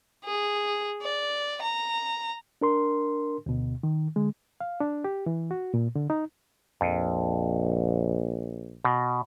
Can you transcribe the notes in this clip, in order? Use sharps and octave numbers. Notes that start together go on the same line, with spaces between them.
G#4
D5
A#5
D4 A#4 C6
D2 B2
D#3
D3 G#3
F5
D4
G4
E3
F#4
A#2
D3
D#4
A#1 F2
B2